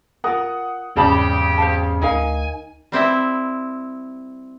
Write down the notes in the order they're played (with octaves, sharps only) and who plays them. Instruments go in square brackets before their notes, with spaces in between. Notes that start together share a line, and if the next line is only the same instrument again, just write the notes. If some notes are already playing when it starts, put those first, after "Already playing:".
[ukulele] F4 A#4 [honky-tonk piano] F#5 D#6
[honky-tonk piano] G#1 C#3 [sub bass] E2 [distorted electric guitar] G4 [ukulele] D5 A5 B5
[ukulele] C5 F5 A5
[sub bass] D2 [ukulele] D#4 A#4 F5 [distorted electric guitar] G#5
[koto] G3 C4 E4 E5